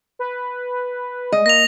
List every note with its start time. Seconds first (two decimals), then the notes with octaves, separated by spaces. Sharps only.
0.19 B4
1.32 G#3 D#5
1.46 A#3 A#6 F7